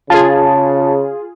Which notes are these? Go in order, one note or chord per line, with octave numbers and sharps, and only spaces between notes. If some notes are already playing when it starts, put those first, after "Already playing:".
C#3 F4 G#4 A5